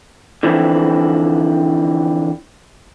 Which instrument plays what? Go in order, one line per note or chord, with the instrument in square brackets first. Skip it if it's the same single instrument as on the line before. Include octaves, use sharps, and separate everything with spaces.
[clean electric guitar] D3 E3 F3 C4 E4